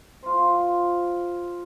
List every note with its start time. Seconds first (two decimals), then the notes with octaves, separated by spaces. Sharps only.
0.23 F4 C5